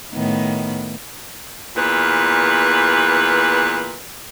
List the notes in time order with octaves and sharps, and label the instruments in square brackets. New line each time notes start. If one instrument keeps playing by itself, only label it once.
[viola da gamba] A2 D#3 B3
[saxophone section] E2 A#2 B4